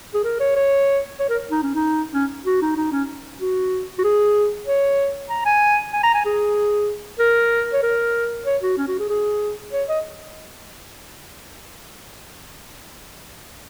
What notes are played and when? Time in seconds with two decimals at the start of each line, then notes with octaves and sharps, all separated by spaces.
0.14 G#4
0.24 A#4
0.40 C#5
0.56 C#5
1.19 C#5
1.29 A#4
1.50 D#4
1.63 C#4
1.75 D#4
2.14 C#4
2.46 F#4
2.61 D#4
2.77 D#4
2.92 C#4
3.41 F#4
3.98 F#4
4.04 G#4
4.66 C#5
5.29 A#5
5.45 G#5
5.92 G#5
6.03 A#5
6.14 G#5
6.25 G#4
7.19 A#4
7.73 C#5
7.82 A#4
8.46 C#5
8.62 F#4
8.77 C#4
8.87 F#4
8.99 G#4
9.09 G#4
9.73 C#5
9.88 D#5